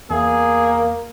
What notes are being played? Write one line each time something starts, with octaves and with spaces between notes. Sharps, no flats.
E2 A#3 G#4